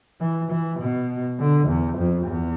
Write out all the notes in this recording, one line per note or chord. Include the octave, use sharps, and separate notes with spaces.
E3
E3
B2
D3
E2
F2
E2